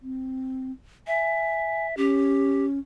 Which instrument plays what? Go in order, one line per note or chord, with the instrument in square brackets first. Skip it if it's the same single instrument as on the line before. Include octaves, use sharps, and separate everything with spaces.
[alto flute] C4
[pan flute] E5 [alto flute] G#5
[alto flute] C#4 [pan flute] G4